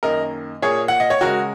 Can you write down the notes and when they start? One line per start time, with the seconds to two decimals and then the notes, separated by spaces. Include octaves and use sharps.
0.03 F#2 D#3 A#3 A#4 D#5
0.62 A#2 A#3 G#4 C#5
0.88 F#5
1.00 D#5
1.10 C#5
1.21 C#3 G#3 F#4 A#4